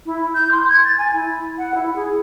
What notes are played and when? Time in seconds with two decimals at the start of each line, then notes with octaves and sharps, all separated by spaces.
0.06 E4
0.34 G6
0.51 C6
0.69 G#6
0.84 A6
0.98 G#5
1.13 E4
1.58 F#5
1.74 E4
1.95 G#4